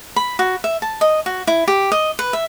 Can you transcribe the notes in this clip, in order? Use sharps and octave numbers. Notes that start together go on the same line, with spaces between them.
B5
F#4
E5
A5
D#5
F#4
E4
G4
D#5
B4
E5